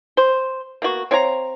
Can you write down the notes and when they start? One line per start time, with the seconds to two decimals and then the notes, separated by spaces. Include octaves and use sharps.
0.17 C5
0.82 A#3 B3 F#4
1.11 C4 C#5 F5 A#5